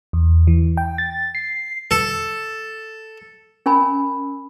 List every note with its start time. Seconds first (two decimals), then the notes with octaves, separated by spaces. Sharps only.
0.13 E2
0.47 E3
0.77 G5
0.98 A6
1.35 C7
1.91 A4
3.66 C#4 A#4 G#5 B5